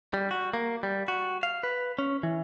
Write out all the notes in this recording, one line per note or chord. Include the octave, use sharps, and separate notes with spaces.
G3
F#4
A#3
G3
F#4
F5
B4
C#4
E3